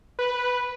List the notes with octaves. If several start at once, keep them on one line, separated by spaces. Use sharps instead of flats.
B4